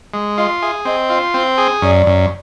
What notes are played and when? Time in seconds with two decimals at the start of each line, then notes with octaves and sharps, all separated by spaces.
0.14 G#3
0.37 F4 D#5
0.62 G#4 E5
0.85 C4 D#5
1.10 F4
1.34 C4
1.58 G#4
1.82 F#2 D5
2.07 F#2